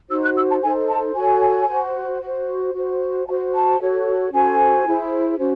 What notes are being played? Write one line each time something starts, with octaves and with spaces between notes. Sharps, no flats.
D#4 F#4 C5 E6
F#6
E6
A5
D#4 A4 C5 G#5
A5
F#4 A4 C#5 G#5
F#4 C5
F#4 C5
F#4 C5
F#4 C5 A5
A5
F#4 A4 C#5
C#4 F#4 A4 C5 G#5
E4 G#4 C5
C#4 F#4 C5